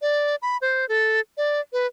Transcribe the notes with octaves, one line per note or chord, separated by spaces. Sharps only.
D5
B5
C5
A4
D5
B4